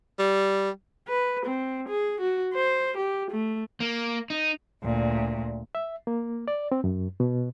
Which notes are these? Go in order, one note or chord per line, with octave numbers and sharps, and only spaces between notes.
G3
B4
C4
G#4
F#4
C5
G4
A3
A#3
D#4
D2 A#2
E5
A#3
D5
C4
F#2
B2